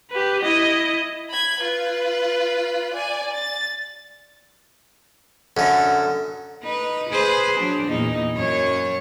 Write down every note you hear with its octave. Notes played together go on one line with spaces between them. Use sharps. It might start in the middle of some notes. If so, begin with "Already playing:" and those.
G4 B4
E4 D#5
B5 G#6
F4 B4
D5 G#5
A6
F#2 D3 A4
D#4 B4
G#4 B4 C5
F#3 D4
E2 A#2 D#4
F#2 C#5